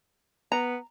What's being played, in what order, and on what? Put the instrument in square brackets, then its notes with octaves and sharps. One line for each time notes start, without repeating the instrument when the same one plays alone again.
[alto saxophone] B3 [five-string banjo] A#5